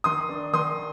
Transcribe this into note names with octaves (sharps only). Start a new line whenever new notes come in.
D#3 C6 D#6
D4
D#3 C6 D#6